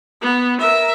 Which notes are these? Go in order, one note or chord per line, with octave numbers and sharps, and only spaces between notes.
B3
A#4 E5